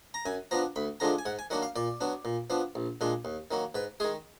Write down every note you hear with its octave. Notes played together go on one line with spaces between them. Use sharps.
A#5
F#2 G#5
F3 B3 D4 A#5
D2 B5
D3 F3 G#3 D4 A#5
G#5
G#2 F#5
G#5
D#3 F#3 A#3 D4 F#5
F5
A#2 D5
F#3 B3 D4
A#2
F3 B3 D4
A#1
A#2 G#3 D4
D#2
D#3 F#3 A#3
G#2 B4
D#3 G#3 G#4